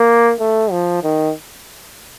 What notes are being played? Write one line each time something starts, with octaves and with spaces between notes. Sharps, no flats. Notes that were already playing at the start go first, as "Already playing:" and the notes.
Already playing: A#3
A3
F3
D#3